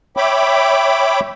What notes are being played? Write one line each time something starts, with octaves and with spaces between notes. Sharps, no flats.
C#5 E5 G5 B5 D6